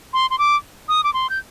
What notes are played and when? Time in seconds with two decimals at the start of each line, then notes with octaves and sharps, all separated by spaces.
0.13 C6
0.30 C6
0.38 D6
0.88 D#6
1.04 D6
1.14 C6
1.30 G6